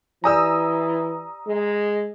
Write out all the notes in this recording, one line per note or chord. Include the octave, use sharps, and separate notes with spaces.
E3 G4 D5 G#5 A#5 D#6 E6
G#3